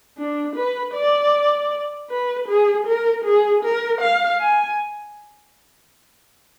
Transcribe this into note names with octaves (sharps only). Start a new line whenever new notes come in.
D4
B4
D5
B4
G#4
A#4
G#4
A#4
F5
G#5